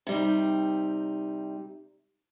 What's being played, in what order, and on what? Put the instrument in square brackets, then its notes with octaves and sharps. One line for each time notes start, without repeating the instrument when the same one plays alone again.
[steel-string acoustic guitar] C3 G3 D#4